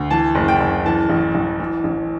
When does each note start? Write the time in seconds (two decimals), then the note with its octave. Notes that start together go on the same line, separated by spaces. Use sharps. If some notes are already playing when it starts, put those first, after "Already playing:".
Already playing: D2
0.10 E3 A5
0.35 F#1
0.48 G5
0.60 F#1
0.86 E3 A5
1.09 A1
1.35 A1
1.60 E3
1.84 A1